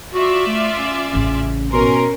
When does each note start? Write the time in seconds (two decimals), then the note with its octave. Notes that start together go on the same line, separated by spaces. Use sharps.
0.14 F4 F#4 D5 E5
0.47 A3
0.78 C#4
1.14 A1 A2 C#3
1.73 B2 C#4 A#4 C6